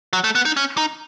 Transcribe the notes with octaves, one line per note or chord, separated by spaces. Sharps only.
F#3
A3
B3
D#4
C#4
D#4